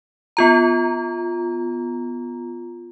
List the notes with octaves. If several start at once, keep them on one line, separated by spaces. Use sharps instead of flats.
B3 F4 A#5